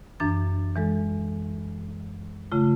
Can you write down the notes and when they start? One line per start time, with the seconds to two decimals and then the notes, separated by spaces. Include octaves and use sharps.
0.20 F#2 E3 D4 A6
0.76 E3 G#3 A4
2.52 C#3 A3 F4